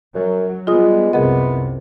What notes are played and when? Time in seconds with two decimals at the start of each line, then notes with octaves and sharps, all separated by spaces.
0.15 F#2 F#3
0.67 G3 G#3 B3 F4 D#6
1.13 C2 F#2 C3 B3 G#4 A#4 D#5